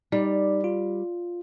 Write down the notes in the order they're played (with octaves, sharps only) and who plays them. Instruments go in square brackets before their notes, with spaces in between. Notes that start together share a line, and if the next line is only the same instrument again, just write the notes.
[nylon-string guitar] G3 [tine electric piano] D#4 D5
[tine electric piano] F4